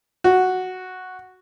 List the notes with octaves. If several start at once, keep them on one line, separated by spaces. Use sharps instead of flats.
F#4